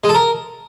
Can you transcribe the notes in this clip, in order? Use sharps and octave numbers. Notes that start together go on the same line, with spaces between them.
G#3
A4
A#4